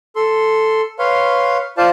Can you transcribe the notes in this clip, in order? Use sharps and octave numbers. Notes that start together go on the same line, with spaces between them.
A4 C6
B4 C#5 F5 C6
F4 C5 D5 F5 A5